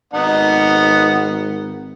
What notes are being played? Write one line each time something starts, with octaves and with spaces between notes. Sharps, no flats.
G#1 B3 D#4 F#5